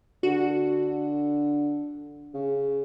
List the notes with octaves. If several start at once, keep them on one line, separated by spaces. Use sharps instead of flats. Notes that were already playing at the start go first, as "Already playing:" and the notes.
D3 F#4
C#3